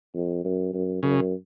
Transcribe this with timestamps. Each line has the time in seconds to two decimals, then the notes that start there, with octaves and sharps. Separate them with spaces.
0.15 F2
0.44 F#2
0.74 F#2
1.03 F#2 C#3